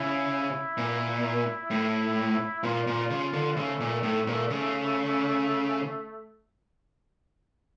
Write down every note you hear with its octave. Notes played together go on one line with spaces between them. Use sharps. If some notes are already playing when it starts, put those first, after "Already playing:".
Already playing: C#3 E4
A#2
A2
A#2 F4
A#2
C#3
D3
C#3 A3
A#2
A2
A#2
C#3